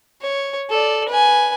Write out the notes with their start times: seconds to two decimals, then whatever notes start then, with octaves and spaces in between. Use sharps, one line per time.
0.22 C#5
0.70 A4 D5
1.09 B4 G#5